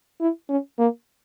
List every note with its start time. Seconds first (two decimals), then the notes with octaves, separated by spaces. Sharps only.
0.21 E4
0.49 C#4
0.79 A#3